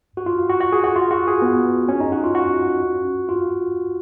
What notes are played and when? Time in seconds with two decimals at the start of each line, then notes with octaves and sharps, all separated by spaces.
0.17 F#4
0.26 F4
0.49 F#4
0.61 F#4
0.72 G#4
0.84 F#4
0.96 F4
1.11 F#4
1.27 G#4
1.42 B3
1.88 C#4
2.00 D#4
2.12 F#4
2.24 F4
2.35 F#4
3.29 F4